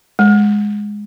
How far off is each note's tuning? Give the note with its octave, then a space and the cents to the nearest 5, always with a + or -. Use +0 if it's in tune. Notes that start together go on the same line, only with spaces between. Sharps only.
G#3 +0